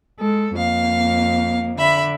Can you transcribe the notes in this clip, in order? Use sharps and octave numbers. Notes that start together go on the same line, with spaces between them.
G#3 A4
F2 A#3 F5
D3 E5 B5